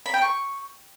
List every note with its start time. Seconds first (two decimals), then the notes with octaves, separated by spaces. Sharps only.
0.06 B5
0.14 G5
0.22 C#6